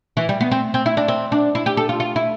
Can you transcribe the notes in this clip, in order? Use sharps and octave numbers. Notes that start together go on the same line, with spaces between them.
E3
G3
B3
C4
C4
E4
D4
C4
D4
E4
G4
A4
F4
F4
E4